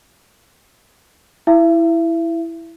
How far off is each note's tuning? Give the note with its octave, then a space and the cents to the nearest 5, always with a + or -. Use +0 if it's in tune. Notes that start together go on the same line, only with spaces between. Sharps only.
E4 +0 E5 +40